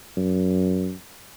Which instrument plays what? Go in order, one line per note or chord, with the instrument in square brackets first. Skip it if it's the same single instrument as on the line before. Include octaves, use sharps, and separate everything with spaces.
[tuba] F#2